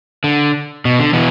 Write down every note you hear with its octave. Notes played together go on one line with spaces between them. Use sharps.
D3
B2
D3
B2 E3